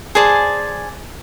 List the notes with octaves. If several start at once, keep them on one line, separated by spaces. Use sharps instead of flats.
G#4 C5 D5 A5